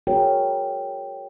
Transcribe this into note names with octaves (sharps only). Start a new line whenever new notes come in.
F#4 G#4 A#4 C#5 G5